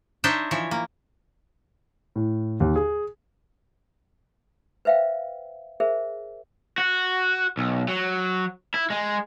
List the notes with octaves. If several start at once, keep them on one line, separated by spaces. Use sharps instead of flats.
D4 D#4 C5 C#5 D#5 E5
E3 F3 C#5
A#3
A2
D#2
G#4
B4 C5 E5 F5 G5
G#4 A#4 C5 E5
F#4
B1
F#3
E4
G#3